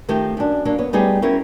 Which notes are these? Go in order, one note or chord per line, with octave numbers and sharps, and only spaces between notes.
D#3 F3 A3 C4 G4
F#2 D4
F#3 A#3 D4
B3 C#5
G3 A3 B3 D#4 G4 G#4
C4 C#4 E4 F#4 A#4